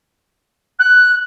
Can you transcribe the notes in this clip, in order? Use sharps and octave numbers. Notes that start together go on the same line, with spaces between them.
F#6